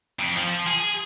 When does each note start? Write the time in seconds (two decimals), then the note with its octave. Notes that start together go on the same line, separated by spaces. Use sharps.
0.19 F2
0.37 F3
0.67 G#4